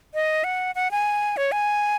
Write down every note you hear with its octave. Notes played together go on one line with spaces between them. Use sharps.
D#5
F#5
F#5
G#5
C#5
G#5